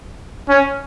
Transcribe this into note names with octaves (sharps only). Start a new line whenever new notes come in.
C#4